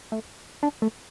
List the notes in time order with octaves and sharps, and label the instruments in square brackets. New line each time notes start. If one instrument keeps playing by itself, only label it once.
[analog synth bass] A3
D4
A3